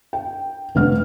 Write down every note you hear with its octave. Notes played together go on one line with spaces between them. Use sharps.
G5
F1 G2 D4 B4 F#5 F6